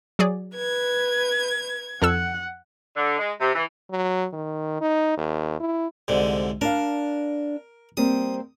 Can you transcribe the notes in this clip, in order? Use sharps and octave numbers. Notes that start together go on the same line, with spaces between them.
F#3 G#4 D5
B4 G#6
F2 A4 F#5 E6
D3
G#3
C3
E3
F#3
D#3
D#4
D#2
E4
C2 G#2 D3
D4 A#4 F5
G3 A#3 C4 D#6